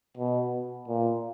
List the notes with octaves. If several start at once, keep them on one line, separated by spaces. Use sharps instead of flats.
B2
A#2